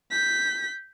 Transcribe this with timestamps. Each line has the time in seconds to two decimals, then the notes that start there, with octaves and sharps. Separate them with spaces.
0.11 G6 B6